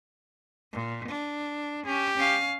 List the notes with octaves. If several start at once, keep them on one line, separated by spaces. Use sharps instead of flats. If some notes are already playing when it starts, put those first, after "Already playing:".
A#2
D4
C#4 G4
C#4 F5